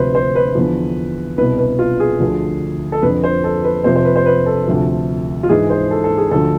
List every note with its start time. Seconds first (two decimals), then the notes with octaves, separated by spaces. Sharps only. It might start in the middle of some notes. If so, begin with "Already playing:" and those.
Already playing: D2 C3 F3 B4 C5
0.15 C5
0.35 B4
0.55 E2 D3 F3
1.38 C2 B2 B4
1.58 B4
1.79 F4
2.00 G#4
2.20 D2 D3 F3
2.92 A4
3.02 F2 D3 F3 B4
3.24 C5
3.44 A4
3.64 B4
3.84 F2 C3 F3 C5
3.96 C5
4.05 B4
4.16 C5
4.26 B4
4.46 A4
4.68 D2 C3 F3
5.43 F4
5.49 G#2 E3 G#4
5.70 C5
5.91 A4
6.04 A4
6.18 G#4
6.31 D2 D3 F3 A4